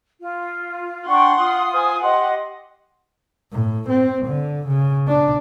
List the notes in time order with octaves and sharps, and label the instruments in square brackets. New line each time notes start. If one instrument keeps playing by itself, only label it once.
[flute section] F4
[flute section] D4 G5 C#6 [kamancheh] F#5 C6
[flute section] F4 D#6
[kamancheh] C5 G#5
[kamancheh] G4 F#5 [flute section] D#5 C6
[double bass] A2
C4
D3
C#3
D4